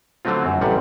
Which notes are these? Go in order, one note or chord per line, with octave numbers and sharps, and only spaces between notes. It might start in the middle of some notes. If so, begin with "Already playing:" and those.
D3 F#3 A3 C4 F4
F#2
A1 C3 G3 F#5